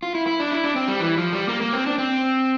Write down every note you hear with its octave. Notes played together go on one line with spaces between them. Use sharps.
F4
E4
E4
D4
E4
D4
C4
G3
E3
F3
G3
A#3
A#3
C4
D4
C4